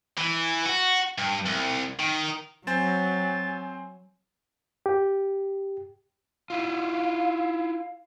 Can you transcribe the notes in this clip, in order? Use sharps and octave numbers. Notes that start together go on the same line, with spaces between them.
E3
F#4
G2
C2
D#3
F#3 C4 C5 G#5 A6
G4
E4 F4 F5